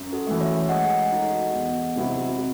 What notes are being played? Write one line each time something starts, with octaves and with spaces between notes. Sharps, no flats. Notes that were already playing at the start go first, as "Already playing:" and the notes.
Already playing: F#2
F#4 A4
E3 A3
C#5 E5
G#3 D#5 F#5
D#4 F#4 A4
E2
C3 F#3 C4 E4
C3